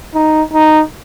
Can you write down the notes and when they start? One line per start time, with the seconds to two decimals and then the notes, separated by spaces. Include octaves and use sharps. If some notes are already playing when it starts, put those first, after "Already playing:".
0.14 D#4
0.53 D#4